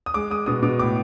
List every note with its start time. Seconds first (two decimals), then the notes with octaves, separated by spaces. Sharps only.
0.06 D#6
0.14 G#3 D6
0.30 G#3 D#6
0.46 B2 D#6
0.62 B2 D6
0.79 A2 D6